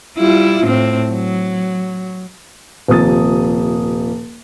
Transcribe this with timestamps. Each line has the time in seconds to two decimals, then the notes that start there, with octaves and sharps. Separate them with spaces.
0.17 G3 E4 F4
0.64 A2 C4
1.10 F#3
2.88 D#1 C3 F3 D#6 A6